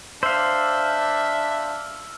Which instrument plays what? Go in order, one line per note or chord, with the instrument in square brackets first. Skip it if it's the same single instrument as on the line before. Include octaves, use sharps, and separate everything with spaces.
[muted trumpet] D4 [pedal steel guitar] C5 F5 [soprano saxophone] E5 [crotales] E6 F6